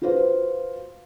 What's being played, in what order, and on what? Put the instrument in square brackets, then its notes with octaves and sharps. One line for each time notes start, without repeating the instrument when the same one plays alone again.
[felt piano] F4 F#4 B4 C5 F5